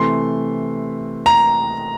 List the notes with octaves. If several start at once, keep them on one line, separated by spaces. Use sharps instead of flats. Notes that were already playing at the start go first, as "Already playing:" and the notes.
Already playing: C3 E3 A3 C6
A#5